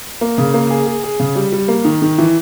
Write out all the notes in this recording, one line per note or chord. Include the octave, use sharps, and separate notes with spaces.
A#3
C#3
A#3
G#4
G#4
G#4
C#3
G3
G3
A#3
D#3
D#3
E3